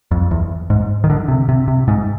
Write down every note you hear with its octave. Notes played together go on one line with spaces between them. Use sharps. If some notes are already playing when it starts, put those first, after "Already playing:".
F2
E2
G#2
D#3
D3
C3
C3
C3
G#2